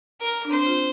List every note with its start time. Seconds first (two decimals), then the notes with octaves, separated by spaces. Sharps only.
0.21 A#4
0.45 D4
0.51 C4 C5
0.66 F4